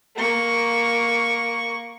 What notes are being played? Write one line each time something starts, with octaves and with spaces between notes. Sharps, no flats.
A#3 C#6